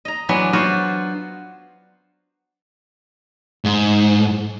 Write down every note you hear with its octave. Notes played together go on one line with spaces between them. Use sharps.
D#5 A#5
E3 F#3 G#3 B3 D4 B4
F#3 B3 F4 F#4 B4 C5
G#2